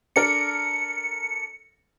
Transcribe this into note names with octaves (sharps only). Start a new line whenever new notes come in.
D4 A4 A#4 C#7